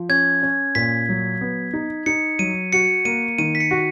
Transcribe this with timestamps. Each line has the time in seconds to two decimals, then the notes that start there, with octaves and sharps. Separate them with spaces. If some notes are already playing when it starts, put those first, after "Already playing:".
Already playing: F3
0.09 C#4 G#6
0.43 C#4
0.75 A#2 B6
1.09 F#3
1.41 B3
1.73 D#4
2.06 D#4 C#7
2.39 F#3 D#7
2.73 F#4 C#7
3.05 A#3 D#7
3.38 D#3 D#7
3.55 B6
3.60 C#7
3.71 F#4